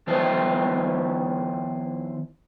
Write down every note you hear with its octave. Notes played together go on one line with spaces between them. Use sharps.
D#3 F3 B3 E4 C5 A5